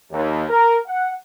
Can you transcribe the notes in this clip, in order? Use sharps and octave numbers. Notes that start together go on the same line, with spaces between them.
D#2
A#4
F#5